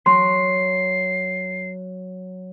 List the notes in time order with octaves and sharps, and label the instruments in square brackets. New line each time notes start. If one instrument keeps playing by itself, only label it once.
[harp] F#3 [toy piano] C6 [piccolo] C7